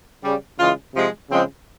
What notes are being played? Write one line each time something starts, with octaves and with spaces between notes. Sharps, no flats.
C#3 G3
C#3 E3 G#3 F4
C3 F3 G#3
C#3 F3 G#3 C4